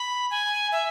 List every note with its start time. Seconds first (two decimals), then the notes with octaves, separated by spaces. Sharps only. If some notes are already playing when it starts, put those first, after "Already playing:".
Already playing: B5
0.31 G#5
0.72 E5